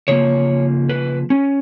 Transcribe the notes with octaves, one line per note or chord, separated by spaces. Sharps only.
C#3 F3 A#3 C#5
B4
C#4